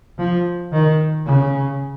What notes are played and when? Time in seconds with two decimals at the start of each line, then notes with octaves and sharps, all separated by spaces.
0.19 F3
0.72 D#3
1.26 C#3